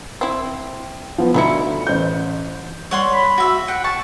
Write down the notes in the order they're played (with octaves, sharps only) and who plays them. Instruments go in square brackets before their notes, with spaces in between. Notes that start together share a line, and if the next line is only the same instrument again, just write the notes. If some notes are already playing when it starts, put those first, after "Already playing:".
[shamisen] C4 E4
[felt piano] F3 B3
[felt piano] D2 C#7 [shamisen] A3 D#4 E4
[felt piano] A1 C5 G6
[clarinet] G3 [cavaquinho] C#5 F#5 C6
[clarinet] B5
[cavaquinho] F#4 E5
[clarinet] F#5 [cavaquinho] G5
[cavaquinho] A5 [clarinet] C#6